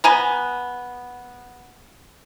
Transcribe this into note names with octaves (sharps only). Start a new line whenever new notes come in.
B3 G#5 A#5